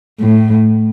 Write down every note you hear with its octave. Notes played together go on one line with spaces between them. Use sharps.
A2